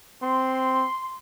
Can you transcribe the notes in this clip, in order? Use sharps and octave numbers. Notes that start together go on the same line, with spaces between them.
C4 C6